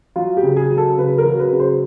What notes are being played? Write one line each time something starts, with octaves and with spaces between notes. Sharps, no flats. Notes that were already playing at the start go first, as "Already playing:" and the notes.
F#3 F4
G4
C#3
G#4
F#3
A4
C#3 B4
A#4
F#3
B4
C#3
C5